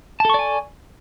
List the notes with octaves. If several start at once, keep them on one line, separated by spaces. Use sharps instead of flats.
A4 D5 G#5 A5 C#6